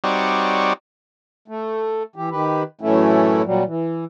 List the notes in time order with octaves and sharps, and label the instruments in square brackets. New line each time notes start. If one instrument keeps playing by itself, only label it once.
[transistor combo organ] G3 C4 D#4 F#4 C#5 D5
[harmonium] A3
E3 G4
D#3 G4 B4
F#2 A2 E3 A3 C#4 E4
A#2 F#3 G3
E3